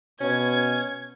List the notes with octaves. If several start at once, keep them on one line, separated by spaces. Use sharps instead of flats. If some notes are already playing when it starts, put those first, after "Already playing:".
B2 C#4 G#6